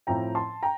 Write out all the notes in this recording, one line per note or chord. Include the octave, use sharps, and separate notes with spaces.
A2 F3 C4 G5 A#5
A5 C6
G5 A#5